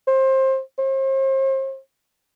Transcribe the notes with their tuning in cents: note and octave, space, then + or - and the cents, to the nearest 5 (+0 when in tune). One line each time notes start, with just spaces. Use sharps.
C5 +25
C5 +40